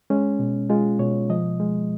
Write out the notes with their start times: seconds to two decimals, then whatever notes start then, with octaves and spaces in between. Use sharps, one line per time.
0.10 G#3 C#4
0.39 B2
0.70 G#3 F4
0.99 B2 C#5
1.29 F3 D#5
1.60 G#3